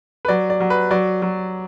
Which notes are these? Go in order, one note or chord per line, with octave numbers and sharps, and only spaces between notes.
B4
F#3 D5
D5
F#3
B4
F#3 D5
F#3